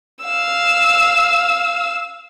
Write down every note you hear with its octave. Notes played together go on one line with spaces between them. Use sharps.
F5 E6